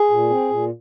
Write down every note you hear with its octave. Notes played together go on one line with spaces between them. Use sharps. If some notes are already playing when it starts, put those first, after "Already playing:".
Already playing: G#4
A#2
C4
A#2